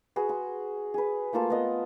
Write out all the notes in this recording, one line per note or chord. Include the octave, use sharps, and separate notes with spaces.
F#4 G#4 B4
C6
G#4 B4
A3 A#3 F4 A4
B3 D#5